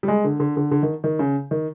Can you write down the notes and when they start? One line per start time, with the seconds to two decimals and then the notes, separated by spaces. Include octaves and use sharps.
0.03 G3
0.08 G#3
0.24 D3
0.40 D3
0.57 D3
0.71 D3
0.82 D#3
1.04 D#3
1.19 C#3
1.51 D#3